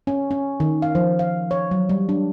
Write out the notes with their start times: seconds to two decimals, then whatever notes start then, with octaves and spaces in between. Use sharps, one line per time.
0.07 C#4
0.31 C#4
0.60 D#3
0.82 F5
0.95 F3
1.19 F5
1.51 C#5
1.71 F#3
1.89 G3
2.09 D4